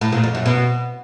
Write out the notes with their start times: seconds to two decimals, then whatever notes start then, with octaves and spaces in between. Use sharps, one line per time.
0.01 A2
0.12 A#2
0.23 F2
0.35 F#2
0.46 B2